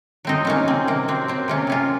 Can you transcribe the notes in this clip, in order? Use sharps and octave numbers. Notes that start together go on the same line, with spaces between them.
F#3 C4 D#4
F#3 A#3 C#4
C3 C4
C3 A#3
F#3 C4
F#3 C4
C3 A#3 C#4
C3 C#4 F4